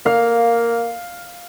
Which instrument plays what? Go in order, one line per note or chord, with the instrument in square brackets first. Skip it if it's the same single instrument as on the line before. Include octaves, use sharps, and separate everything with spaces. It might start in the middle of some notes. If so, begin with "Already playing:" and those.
[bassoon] A#3 [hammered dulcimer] F5